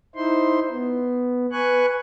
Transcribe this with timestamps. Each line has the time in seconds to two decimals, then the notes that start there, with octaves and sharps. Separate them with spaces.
0.15 D#4 E4 C5 C6
0.70 B3
1.52 B4 G#5 C#6 F#6